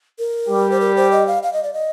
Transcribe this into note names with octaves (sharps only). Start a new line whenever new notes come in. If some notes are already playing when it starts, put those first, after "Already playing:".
A#4
G3 G4
C5
A#4
C5
D#5
F5
F5
D#5
D5
D#5